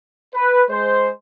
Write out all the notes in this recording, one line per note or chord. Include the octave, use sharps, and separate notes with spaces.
B4
G#3 C5